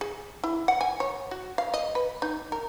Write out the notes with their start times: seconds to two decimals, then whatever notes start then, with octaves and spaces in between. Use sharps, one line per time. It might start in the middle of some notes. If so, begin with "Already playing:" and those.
0.01 G#4
0.44 E4
0.68 F#5
0.81 G#5
1.00 C#5
1.31 F#4
1.58 F5
1.74 D#5
1.95 B4
2.22 D#4
2.52 A#4